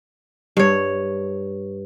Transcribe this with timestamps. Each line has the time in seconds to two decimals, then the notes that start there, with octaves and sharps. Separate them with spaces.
0.57 G2 C#5